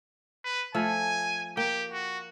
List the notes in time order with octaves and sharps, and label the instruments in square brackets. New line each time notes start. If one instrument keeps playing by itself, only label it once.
[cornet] B4
[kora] F3 A3 A4 [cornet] G#5
[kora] A#3 G5 [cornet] G4
[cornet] F#4